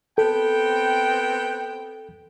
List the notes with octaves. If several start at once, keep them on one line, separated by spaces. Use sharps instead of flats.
B3 C4 A4 G5